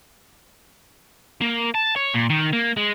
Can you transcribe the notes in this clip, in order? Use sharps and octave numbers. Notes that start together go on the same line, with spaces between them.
A#3
A5
C#5
A#2
D#3
A#3
G#3